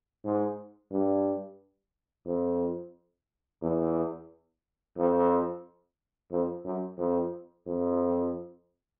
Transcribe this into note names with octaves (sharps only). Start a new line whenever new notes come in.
G#2
G2
F2
E2
F2
F2
F#2
F2
F2